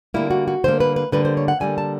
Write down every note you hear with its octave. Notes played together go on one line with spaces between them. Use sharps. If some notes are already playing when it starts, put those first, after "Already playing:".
D3 G3 A#3 E4
F#4
F#4
D3 G3 A#3 C5
B4
B4
D3 G3 A#3 B4
C5
C#5
F#5
D3 G3 A#3 G#5
A5